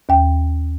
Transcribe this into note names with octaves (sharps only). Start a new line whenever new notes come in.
D#2 G5